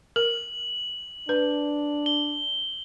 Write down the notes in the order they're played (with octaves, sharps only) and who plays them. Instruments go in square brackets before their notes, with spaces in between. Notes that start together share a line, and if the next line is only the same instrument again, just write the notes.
[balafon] A#4 [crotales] F#7
[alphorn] D4 [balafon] B4
[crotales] G7